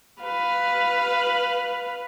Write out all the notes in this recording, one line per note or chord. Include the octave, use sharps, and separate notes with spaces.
B4 F5